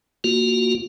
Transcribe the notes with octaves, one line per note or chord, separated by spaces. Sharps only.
A#3 F4 F#4